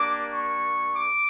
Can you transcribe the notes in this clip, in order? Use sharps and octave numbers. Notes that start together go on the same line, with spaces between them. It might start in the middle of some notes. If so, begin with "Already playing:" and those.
Already playing: A#3 D4 G4 D6
C#6
D6